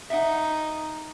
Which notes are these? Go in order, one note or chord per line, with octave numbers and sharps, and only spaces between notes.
D#4 E5 F#5